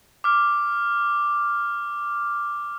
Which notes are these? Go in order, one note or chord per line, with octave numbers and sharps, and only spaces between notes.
D6 F6